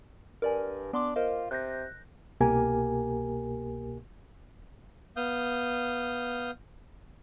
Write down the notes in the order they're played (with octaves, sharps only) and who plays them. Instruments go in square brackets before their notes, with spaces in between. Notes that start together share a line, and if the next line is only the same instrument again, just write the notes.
[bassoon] G2 [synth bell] A#4 D5 G#5
[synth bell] B3 C6 D6 [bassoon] D4
[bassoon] F4 [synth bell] A#4 C5 D#5
[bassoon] C3 [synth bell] F#6 G6 A#6
[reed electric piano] C2 B2 A#3 G4 A#4 G#5
[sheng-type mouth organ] B3 F5 D#6 G6